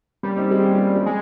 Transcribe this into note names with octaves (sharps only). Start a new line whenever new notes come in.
G3 A#3 C#4
C4 D#4
G#3 C4
A#3 C#4
C#4 F4
G#3
G3 G#3